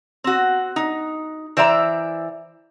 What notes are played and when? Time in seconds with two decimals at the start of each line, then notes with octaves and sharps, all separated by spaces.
0.24 C4 F#4
0.76 D#4
1.57 E3 C5 D5 E5 A#5